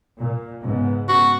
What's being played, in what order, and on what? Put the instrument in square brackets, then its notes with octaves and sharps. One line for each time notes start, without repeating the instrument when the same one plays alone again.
[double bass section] A#2
G#2 C#3 B3
[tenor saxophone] F#4